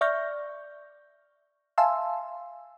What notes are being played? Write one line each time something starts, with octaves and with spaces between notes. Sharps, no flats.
D5 E5 C#6 F6 G6 A#6
E5 F5 G#5 A5 C6 E6